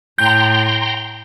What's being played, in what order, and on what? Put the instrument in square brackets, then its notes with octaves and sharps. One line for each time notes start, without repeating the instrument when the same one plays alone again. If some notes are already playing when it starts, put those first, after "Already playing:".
[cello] A2 [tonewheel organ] G5 A#5 C6 [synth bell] G6